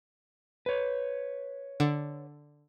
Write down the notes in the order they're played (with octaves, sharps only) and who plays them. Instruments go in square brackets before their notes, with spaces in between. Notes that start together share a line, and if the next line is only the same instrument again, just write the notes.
[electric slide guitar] B4 C#5
[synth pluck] D3